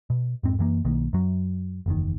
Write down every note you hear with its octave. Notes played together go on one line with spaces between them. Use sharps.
B2
F2 G#2 C4
F#2 E3 A#3
B1 D#3 A#3
F#2 F#3
F#1 E2 D#3